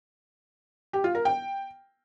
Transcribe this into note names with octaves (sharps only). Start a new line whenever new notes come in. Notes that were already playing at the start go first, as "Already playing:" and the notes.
G4
F4
A#4
G5